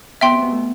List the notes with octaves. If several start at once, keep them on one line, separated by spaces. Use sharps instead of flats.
B2 B3 E5 G5 C6
C3 C4
B2 B3
A3